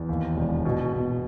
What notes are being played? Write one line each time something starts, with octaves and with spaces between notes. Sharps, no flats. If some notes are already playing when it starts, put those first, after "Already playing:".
Already playing: E2
D#2
E1
B2
B2